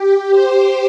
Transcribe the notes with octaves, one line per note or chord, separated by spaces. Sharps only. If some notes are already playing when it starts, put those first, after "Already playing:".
Already playing: G4
C5